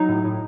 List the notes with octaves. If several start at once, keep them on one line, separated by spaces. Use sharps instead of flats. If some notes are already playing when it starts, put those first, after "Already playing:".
Already playing: F#3 D#4
A2
A2